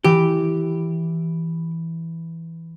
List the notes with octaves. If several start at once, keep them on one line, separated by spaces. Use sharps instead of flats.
E3 G4